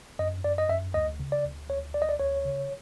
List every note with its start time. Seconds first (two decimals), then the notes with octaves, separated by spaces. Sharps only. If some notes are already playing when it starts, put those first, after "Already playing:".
0.19 F#2 D#5
0.44 F#2 D5
0.58 D#5
0.69 F#2 E5
0.94 D2 D#5
1.19 C#3
1.32 D5
1.44 D2
1.69 D2 C#5
1.94 D2 D5
2.02 D#5
2.09 D5
2.20 D2 C#5
2.45 C#3